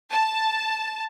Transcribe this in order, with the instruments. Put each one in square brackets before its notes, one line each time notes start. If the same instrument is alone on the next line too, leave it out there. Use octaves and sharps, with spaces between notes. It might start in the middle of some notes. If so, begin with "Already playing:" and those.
[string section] A5